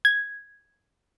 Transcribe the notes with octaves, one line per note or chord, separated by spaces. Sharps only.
G#6